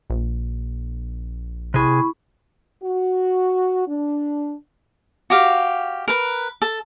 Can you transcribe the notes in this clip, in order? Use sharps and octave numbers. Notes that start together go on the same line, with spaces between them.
A#1
C3 E4 G#4 B5 C#6
F#4
D4
F#4 G4 F5
A#4 B4
A4